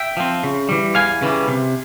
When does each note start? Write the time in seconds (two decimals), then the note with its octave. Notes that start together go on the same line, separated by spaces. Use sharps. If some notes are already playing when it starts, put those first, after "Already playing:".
Already playing: E5 G5
0.17 F3 C4
0.43 C#3
0.69 E3 G3
0.95 E2 F5 G#5
1.22 C#3 E3 G3
1.48 C3